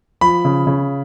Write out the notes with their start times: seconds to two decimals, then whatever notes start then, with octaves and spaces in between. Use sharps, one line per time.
0.21 F3 B5
0.45 C#3
0.67 C#3